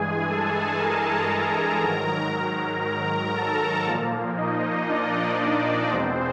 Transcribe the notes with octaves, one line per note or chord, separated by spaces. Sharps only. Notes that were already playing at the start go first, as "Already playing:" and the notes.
Already playing: G2 E3 G#3 G#4 G#5
A4 A5
A#4 A#5
A#4 A#5
G#2 D#3 F#3
A#4 A#5
A4 A5
A#2 F3 A#3
D#4 D#5
D4 D5
D4 D5
E2 B2 G#3 C4 C5